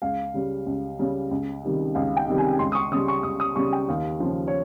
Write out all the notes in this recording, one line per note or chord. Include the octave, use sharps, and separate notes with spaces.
C#2 F5
C#3 G3
C#2
C#3 G3
C#2
C3 D#3 G3
C#2 F5
G5
C3 D#3 G3
G#5
C#2 C6
D#6
C#6
C#3 G3 D#6
C#6
C#2 D#6
D#6
C#3 G3 C#6
G5
D#2 F5
C#3 F3
C#5